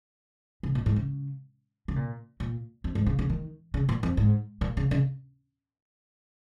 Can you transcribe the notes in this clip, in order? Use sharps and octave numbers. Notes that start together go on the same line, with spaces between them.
C#3
A#2
G#2
C#3
C#3
A#2
A#2
F2
G#2
C#3
C#3
D#3
C#3
A#2
F2
G#2
A#2
C#3
C#3